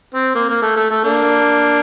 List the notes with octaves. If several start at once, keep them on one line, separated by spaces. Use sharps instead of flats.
C4
A#3
A#3
A3
A3
A3
A#3 D4